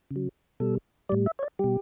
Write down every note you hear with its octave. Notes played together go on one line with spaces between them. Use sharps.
C#3
F#3
B2 G3 A4
A2 G3 D5
E5
C#5
D5
B2 G3 G4